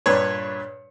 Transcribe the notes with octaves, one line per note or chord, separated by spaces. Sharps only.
G2 A#2 D4 B4 C#5